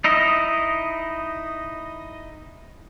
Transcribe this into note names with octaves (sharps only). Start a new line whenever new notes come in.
D#4 E4 D#5